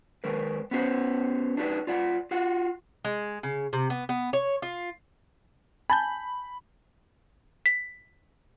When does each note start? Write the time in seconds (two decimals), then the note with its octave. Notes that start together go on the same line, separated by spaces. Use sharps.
0.24 D#3 G#3 A#4 B4
0.71 B3 C#4 F#4 B4 C5
1.57 D4 D#4 F#4 B4 C5 D5
1.87 F4 D5 F#5
2.31 F4 F#4 F#5
3.05 G#3
3.43 C#3
3.73 C3
3.90 B3
4.09 B3
4.33 C#5
4.62 F4
5.90 G#5 A5 B5 G6
7.66 B6